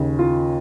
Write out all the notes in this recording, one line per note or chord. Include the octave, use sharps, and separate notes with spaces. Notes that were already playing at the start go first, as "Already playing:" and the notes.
Already playing: D#2 C#3
F4